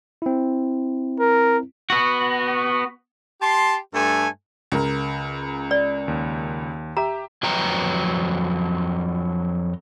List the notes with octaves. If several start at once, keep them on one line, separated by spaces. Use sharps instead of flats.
C4 E4
A#4
B3 F#4
G4 A5 C6
G2 A3 A4 G#5
C#2 A#4
D5
D#2
G4 E5 A#5
F2 F#3 B4 G5 A#5